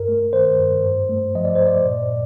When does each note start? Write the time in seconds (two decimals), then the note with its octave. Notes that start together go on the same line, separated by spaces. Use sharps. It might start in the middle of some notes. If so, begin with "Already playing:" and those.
Already playing: G2 A#4
0.08 A3
0.33 D#3 C5
0.59 G2
0.85 G2
1.09 A3
1.35 F3 D#5
1.45 D5
1.55 C5
1.61 G2
1.67 D5
1.85 A#2
2.10 A#2